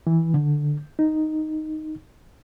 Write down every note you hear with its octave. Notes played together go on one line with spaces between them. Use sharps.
E3
D3
D#4